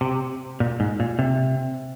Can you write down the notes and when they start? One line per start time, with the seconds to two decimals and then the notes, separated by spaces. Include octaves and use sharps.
0.01 C3
0.60 A#2
0.80 G#2
1.00 A#2
1.19 C3